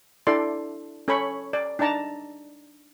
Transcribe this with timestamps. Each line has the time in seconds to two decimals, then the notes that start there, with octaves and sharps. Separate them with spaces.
0.27 D4 E4 A4 D5 C6
1.08 C#4 A4 C#5 G#5 B5 C#6
1.53 D5
1.79 D4 D#4 D5 A5 A#5